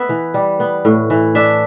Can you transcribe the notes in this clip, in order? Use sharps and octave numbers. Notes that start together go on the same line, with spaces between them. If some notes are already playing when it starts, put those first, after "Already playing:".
Already playing: B3 E5
E3
G3
B3
A2
E3
D4 E5